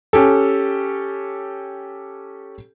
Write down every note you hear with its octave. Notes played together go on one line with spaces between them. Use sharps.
C#4 G4 A4